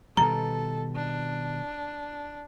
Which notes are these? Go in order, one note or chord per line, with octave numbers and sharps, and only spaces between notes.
B2 D#3 G3 A4 A#5
D4